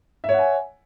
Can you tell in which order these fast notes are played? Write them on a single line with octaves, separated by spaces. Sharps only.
E5 C#5 F#5 G#5